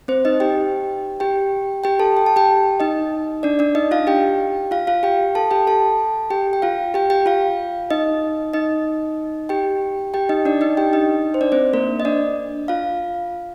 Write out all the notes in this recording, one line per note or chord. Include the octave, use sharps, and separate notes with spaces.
C4 C5
D#4 D#5
G4 G5
G4 G5
G4 G5
A4 A5
G5
A5
G4 G5
D#4 D#5
D4 D5
D4 D5
D#4 D#5
F4 F5
G4 G5
F4 F5
F4 F5
G4 G5
A4 A5
G4 G5
A4 A5
G4 G5
G5
F4 F5
G4 G5
G4 G5
F4 F5
D#4 D#5
D#4 D#5
G4 G5
G4 G5
D#4 D#5
D4 D5
D#4 D#5
G4 G5
D#4 D#5
C5
D4 D5
C4 C5
A#3 A#4
D#5
D4 D5
F4 F5